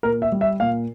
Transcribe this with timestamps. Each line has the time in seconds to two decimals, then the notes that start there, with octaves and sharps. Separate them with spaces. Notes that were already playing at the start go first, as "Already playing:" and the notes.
0.03 A#2 A#4
0.22 E5
0.32 G3
0.41 E5
0.60 A#2 F5